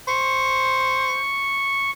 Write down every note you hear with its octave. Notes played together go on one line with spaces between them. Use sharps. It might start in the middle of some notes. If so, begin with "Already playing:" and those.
C5 C#6